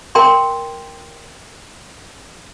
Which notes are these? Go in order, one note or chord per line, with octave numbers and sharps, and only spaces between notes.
A#4 G5 A#5 C6